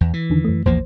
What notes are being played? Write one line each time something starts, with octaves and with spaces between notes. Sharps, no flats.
E2
E3
E2 D3 D#3
F#2 A3
A#1 E2 F3 A#3 C5